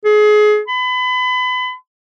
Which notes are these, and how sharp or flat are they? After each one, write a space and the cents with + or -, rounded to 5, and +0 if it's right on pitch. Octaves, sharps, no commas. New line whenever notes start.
G#4 +25
B5 +30